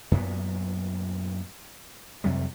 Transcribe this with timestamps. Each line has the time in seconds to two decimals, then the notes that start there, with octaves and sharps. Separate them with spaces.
0.11 F#2 A#2 F#3 B3
2.24 F2 C3 F#3 G3